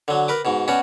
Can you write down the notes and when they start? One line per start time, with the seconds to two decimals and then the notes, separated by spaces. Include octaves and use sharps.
0.08 D3 F#3
0.28 A#4 B4 D6
0.45 G#2 B2
0.68 B2 C#4 F#4 D5